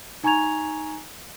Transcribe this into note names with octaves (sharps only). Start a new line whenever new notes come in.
D#4 G#5 A#5 C#6 G#6 F7